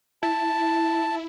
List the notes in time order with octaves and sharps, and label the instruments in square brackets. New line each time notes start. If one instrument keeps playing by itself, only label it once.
[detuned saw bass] E4 [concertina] A5